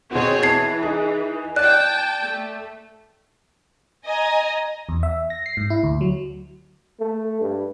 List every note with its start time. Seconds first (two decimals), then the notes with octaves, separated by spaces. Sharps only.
0.11 B2 C4 F#4 G#4 C#5
0.43 E3 A5 G#6 C7
0.83 D#4 G#4
1.56 D5 G5 A5 F#6
2.23 A3
4.06 D#5 G#5 A#5
4.89 E2
5.03 E5
5.30 A#6
5.46 C7
5.57 G#2
5.70 E4
5.84 D2
6.01 F#3
7.00 A3
7.41 G2